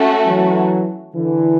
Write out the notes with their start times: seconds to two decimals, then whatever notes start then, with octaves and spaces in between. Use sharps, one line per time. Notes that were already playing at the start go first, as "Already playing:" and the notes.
Already playing: A3 C#4 F#4
0.26 E3 F#3
1.16 D3 E3